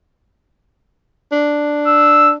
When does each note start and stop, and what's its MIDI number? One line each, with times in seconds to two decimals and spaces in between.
1.32 2.35 62
1.87 2.33 88